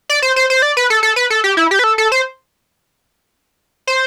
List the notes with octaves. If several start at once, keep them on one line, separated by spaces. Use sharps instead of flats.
D5
C5
C5
C5
D5
B4
A4
A4
B4
A4
G4
E4
G4
B4
A4
A4
C5
C5